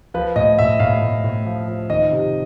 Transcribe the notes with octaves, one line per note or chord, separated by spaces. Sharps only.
F3 B4
A2 D#5
A2 E5
A2 F5
A2
A2
F3
F3
D#3 D#5
C3